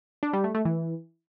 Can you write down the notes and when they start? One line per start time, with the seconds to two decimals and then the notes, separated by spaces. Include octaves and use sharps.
0.23 D4
0.33 G3
0.44 A3
0.55 A3
0.65 E3